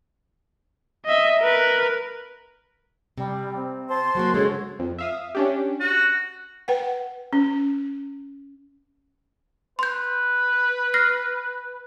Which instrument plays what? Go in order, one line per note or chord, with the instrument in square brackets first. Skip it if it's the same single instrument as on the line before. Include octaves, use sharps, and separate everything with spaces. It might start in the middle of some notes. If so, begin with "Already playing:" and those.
[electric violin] D#5 E5
A#4 B4
[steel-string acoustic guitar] C3 [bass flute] G3
[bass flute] C4
[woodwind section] C5 A5 C6
[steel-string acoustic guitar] F#3 A3 A#3 [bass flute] F#4
[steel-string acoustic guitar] C#3 G#3 [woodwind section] D4 A4 C#5
[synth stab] F2
E5 F5 D#6
C#4 D4 G4
[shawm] F#4
[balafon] B4 F#5 G5
C#4
[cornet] B4 [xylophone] C6 G6
[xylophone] F6 A#6 C7